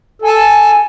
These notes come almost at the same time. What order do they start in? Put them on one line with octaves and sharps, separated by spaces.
A4 G#5 A5